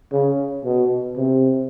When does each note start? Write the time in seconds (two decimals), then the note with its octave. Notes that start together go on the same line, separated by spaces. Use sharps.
0.12 C#3
0.65 B2
1.17 C3